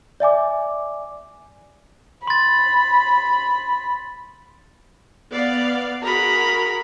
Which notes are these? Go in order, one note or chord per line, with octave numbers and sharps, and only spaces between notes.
D5 E5 G#5 D6
B5 C6 A6
B3 D5 F5
F#4 G#4 A#4 A#5 B5